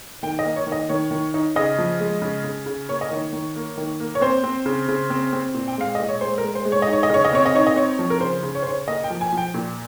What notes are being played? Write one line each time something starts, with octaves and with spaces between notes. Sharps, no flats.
D#3 G5
D#5
A#3
C#5
D#3
D#5
D#3 C#5
D#3
D#4
C#3 D#5
F3
G#3
C#3
C#3
C#3
A#3 C#5
D#5
D#3 C#5
D#3
A#3
D#3
A#3
C#5
C4 C5
C4
C#3
C#3
C4
C4
A#2
G5
G#3 F5
A#2 D#5
C#5
G#3 C5
A#4
G#3
C5
G#3
C#5
D#5
D#4
C#5
D#5
C#3 C#5
D#5
C4 C#5
D#5
D#4 C#5
D#5
C4 C#5
F3
A#4
C#3 C5
C#3
C#5
C5
C#3 C#5
A#3 D#5
G5
F3
G#5
F3 G5
A#2